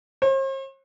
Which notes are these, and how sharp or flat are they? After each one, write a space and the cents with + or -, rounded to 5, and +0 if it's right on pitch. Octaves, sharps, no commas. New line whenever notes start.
C5 +45